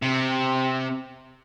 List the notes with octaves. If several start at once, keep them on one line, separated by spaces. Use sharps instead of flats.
C3